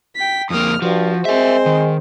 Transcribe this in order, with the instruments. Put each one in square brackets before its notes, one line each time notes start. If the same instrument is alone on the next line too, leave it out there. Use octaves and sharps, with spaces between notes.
[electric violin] G5 B6
[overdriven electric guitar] F2 A#3 [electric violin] D#6 F6
[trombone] G2 [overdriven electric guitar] F3 [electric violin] F#4
[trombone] G#3 [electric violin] C4 C5 [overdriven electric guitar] A#4 E5
[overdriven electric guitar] D#3